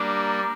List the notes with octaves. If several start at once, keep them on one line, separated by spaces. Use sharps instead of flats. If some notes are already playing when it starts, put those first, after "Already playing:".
Already playing: G3 A#3 D4 A#5 D6